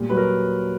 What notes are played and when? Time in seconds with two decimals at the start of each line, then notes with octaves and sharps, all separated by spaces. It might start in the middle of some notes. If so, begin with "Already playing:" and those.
Already playing: A#2 G3
0.10 F#3 B4
0.17 A#4